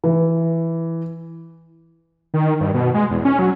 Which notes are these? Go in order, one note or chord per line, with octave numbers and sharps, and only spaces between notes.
E3
D#3
G2
B2
G#3
E2
C#4
F#3